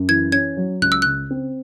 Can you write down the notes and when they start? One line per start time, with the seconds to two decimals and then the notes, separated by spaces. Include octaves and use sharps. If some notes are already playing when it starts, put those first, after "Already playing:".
Already playing: F#2
0.09 E3 G#6
0.32 C#4 G#6
0.57 F#3
0.82 C#2 F#6
0.92 E6
1.02 C#3 F#6
1.30 C4